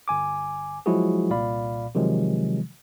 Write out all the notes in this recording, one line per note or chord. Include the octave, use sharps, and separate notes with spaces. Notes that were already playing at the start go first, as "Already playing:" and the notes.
G1 G#5 D6
F3 F#3 G#3 E4 F#4 G#4
C2 A#2 D5 F5 B5
C3 D#3 F3 F#3 G#3